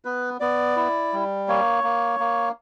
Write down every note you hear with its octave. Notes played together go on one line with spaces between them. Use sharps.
B3 B4
B3 D5
E4
G3
A#3 C#5
A#3
A#3